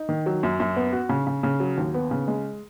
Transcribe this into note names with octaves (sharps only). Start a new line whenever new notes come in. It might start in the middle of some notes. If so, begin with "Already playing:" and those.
Already playing: D#4
D#3
F#3
F#2
F#2
B3
F#4
C#3
C#3
C#3
F#3
D#2
B3
C#3
G#3